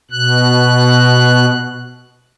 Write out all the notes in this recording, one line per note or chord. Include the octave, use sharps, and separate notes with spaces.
B2 F#6